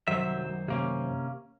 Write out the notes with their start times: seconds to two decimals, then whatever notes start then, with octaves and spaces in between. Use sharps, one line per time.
0.08 C2 F#2 D#3 F#3 C5 E5
0.68 C3 A#3 C#4